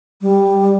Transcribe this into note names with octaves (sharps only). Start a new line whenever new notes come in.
G3